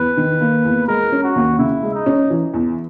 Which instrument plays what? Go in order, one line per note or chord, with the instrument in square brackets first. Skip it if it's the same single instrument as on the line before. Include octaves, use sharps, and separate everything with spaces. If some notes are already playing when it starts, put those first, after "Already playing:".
Already playing: [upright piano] E2 [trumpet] B4
[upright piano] D#3
A#3
E2
[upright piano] G#3 [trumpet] A#4
[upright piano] C#4
[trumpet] F#4
[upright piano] D#2
[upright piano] C#3 [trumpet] E4
[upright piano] G#3
[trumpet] D#4
[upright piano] C#4
E3
E2